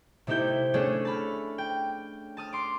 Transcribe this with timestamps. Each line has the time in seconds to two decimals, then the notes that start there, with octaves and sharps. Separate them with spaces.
0.27 C3 A3 D#4 E4 G4 G6
0.74 A3 C#4 D4 G#4 A4 C#5
1.05 A5 B5 F6
1.58 G5
2.37 A5 D#6 F6
2.53 C6 D6